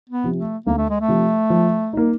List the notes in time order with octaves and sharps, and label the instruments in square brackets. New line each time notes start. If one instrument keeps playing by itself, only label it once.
[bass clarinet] B3
[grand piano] C3 F3
[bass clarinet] A3
[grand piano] D2 [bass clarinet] A#3
[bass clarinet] A3
G#3
A3
[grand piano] C3 F3
F3
A#3 D#4